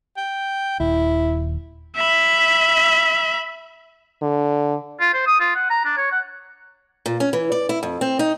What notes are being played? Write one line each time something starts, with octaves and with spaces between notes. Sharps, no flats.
G5
D#1 D#2 E4
E5 B5
D3
F4
C5
D#6
F4
F#5
A#5
D4
C#5
F#5
A#2
C#4
E3
D5
E4
F2
C4
D#4